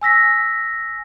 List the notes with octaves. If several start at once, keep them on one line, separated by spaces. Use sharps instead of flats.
G#5 E6 A#6 B6